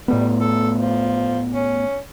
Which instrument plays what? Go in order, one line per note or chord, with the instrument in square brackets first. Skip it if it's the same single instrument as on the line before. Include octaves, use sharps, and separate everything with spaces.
[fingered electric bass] A2 A3 B3 [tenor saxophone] G3
[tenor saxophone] A4
F3
C#4